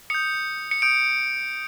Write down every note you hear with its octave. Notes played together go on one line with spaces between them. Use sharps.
D#6 G6 C#7
C#7
D#6 G6 D7